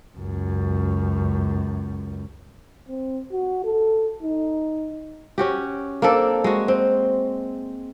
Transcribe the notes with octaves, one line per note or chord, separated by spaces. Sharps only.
C#2 F#2
C4
F#4
A4
D#4
C#4 F#4 G4
A#3 C4 D4 A4
G#3 F#4
C4